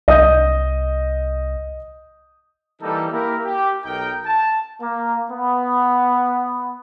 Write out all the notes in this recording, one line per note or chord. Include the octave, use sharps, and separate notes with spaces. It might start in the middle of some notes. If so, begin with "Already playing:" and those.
C2 D#5 D#6 G6
E3 G3 A#3 D#4 A4
A#3 E4 G4 A#4
G4
B1 D#4 A#4 G5
A5
A#3
B3